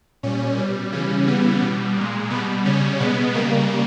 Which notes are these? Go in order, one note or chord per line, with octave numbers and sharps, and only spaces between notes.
A#2 G3 C#4
B2 G3
C#3 E3 G3 C#4
C#3 E3 G3 B3
B2 G3
A#2 G#3
B2 G3 B3
C#3 G3 C#4
B2 G#3 B3
C#3 G3 A#3